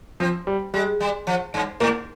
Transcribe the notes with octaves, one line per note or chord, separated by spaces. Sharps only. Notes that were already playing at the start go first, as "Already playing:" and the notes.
F3 C4
G3
G3 G#3
G3
F3
G2
G#2 A#3